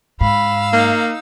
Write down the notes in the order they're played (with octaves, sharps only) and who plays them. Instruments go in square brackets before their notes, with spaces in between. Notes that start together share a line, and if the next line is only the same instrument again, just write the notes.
[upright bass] G#2 [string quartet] F5 E6 [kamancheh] B5
[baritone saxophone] A#3 [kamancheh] D#4